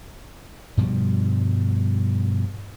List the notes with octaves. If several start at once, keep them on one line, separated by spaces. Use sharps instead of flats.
G2 B2 F3 G3